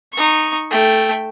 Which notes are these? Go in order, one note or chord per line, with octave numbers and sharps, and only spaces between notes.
D#4 C#6
A3 G5